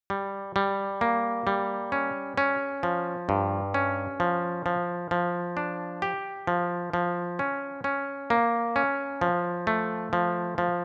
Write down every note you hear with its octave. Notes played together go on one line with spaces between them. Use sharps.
G3
G3
A#3
G3
C#4
C#4
F3
G2
C#4
F3
F3
F3
D4
G4
F3
F3
C#4
C#4
A#3
C#4
F3
A3
F3
F3